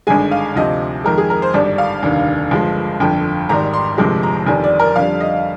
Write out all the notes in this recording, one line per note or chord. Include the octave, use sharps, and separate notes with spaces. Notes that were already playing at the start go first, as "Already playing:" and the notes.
G#1 G2 D3 G#3 G#5
F5
D2 C3 F3 D#5
F2 D#3 G#3 A#4
G#4
A#4
C5
G#1 G2 D3 G3 D5
F5
F1 D#2 D3 G3
G1 G2 F3 G#3
G1 F2 D3 G5
G#1 G#2 D#3 G3 A#5
C6
G1 F2 C3 F3 G#3
A#5
G1 F2 D#3 G3 G#5
D5
A#4
F2 D3 G3 F5
D#5